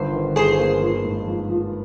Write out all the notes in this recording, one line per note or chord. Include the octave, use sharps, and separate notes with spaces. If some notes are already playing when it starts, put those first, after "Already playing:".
Already playing: G1 G2 D#3 C5
D#3
G2 G#4 C5
A#3
F3
G#2
F3
F3